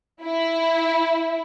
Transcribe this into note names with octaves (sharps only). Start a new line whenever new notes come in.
E4